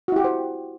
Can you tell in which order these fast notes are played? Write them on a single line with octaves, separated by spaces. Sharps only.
F#4 E4 G4 F#5 C5